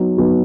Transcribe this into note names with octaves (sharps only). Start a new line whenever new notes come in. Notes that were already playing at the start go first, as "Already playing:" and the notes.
Already playing: F#3 B3 D#4
F#3 B3 D#4